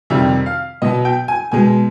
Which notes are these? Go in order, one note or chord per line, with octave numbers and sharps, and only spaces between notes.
F2 C3 D#3 G3 E5
F5
B2 F#3 D#5
G5
G#5
B2 G#3 G#5